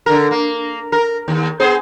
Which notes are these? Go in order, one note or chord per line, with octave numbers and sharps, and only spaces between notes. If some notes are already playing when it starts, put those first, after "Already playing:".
D3 A#4
A#3
A#4
D#2
B3 G#4 C5